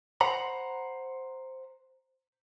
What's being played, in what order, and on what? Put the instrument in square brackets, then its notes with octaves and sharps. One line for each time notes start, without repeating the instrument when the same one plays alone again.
[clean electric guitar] C5 F#5 A#5 B5